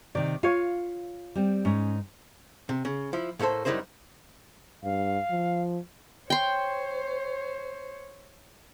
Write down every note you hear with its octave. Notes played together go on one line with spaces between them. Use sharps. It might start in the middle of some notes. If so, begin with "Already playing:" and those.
C3 D#3 D5
F4 C#5 F5
G3 C4
G#2 C#4 D#4
C3
C#3
F3 E4
A2 A3 A#3 A4 C5
F#2 G3 D#4 E4 A#4 C5
G2 F5
F3
C5 C#5 G5 C6